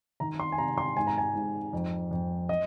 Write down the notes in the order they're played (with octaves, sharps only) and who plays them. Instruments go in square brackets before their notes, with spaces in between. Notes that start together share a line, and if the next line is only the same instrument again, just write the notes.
[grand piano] D#3 A#5
C6
G#5
C3 A#5
C6
G#2 G#5
A#5
G#5
G#2
F2
F2
D#5